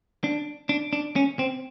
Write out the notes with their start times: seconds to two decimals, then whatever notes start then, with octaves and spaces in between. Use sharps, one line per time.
0.24 D4
0.69 D4
0.93 D4
1.16 C#4
1.39 C4